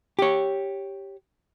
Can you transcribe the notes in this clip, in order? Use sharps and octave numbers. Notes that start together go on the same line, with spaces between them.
G4 C#5